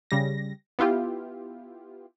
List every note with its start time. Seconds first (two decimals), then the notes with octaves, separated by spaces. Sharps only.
0.11 C#3 G3 A#6
0.79 B3 E4 F4 G4